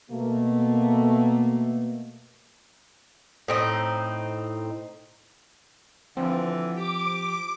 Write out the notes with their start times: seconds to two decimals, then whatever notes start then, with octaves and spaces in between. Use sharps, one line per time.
0.11 B2 A3 A#3
3.48 A2 C4 D#4
6.17 D3 E3 F3 C4
6.76 G4 D6